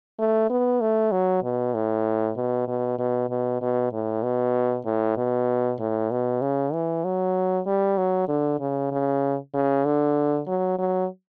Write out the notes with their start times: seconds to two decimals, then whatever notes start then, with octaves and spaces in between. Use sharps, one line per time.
0.19 A3
0.49 B3
0.81 A3
1.11 F#3
1.43 B2
1.74 A2
2.36 B2
2.68 B2
2.99 B2
3.30 B2
3.61 B2
3.92 A2
4.23 B2
4.85 A2
5.17 B2
5.79 A2
6.11 B2
6.41 C#3
6.73 E3
7.04 F#3
7.66 G3
7.97 F#3
8.28 D3
8.60 C#3
8.91 C#3
9.54 C#3
9.85 D3
10.47 F#3
10.78 F#3